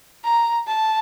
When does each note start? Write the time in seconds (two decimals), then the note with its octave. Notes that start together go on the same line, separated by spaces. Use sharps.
0.24 A#5
0.67 A5